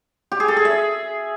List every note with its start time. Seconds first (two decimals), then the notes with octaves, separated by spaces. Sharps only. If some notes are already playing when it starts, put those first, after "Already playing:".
0.32 G4
0.40 G#4
0.48 A4
0.57 G#4
0.65 E5